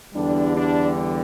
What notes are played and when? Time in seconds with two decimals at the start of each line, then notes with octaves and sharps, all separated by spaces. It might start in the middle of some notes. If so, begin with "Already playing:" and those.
0.14 E2 D3 G3 D4
0.55 D4